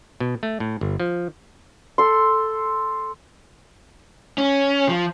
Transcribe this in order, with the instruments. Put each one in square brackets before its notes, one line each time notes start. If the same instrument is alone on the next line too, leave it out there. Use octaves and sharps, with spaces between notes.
[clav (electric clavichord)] B2
A3
A2
G1
F3
[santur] A4 C6
[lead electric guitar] C#4
F3